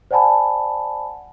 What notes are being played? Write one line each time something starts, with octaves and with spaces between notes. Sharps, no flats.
C5 D5 F#5 G#5 A5 B5